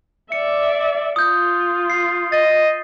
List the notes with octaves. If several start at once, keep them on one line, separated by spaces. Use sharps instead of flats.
D5 E5 C#7
F4 D#6 G6
C7
D#5 A6